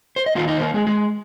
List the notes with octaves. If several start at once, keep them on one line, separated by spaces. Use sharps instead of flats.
C5
D#5
D#3 A#3 D#4 F4 F5
D#4 D#5
C5
A#3 A#4
G#3 G#4
G#3 G#4